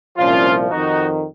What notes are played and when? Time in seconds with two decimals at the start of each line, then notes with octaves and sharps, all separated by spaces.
0.17 C2 A#2 F3 C#4 F4
0.70 F2 D#3 D#4 F#4